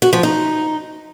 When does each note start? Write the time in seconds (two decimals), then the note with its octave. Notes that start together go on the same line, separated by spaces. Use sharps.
0.02 F#4
0.13 F3
0.23 D#4